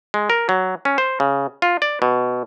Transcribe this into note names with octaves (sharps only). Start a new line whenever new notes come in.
G#3
A#4
F#3
C#4
C5
C#3
F4
D5
B2